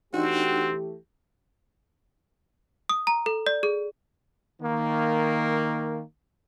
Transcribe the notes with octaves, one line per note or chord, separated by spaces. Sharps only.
E3 A3 C4 D4 D#4 F#4 G4
D#6
A#5
A4
D5
G#4
D#3 A#3